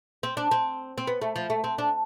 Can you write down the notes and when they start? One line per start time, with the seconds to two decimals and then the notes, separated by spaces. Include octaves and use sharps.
0.23 C4
0.37 D4
0.51 C4
0.98 C4
1.07 B3
1.21 A3
1.36 F3
1.50 A3
1.64 C4
1.78 D4